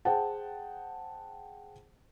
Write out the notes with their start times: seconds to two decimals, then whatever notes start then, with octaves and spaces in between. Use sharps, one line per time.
0.05 G#4 C5 F#5 G5 A5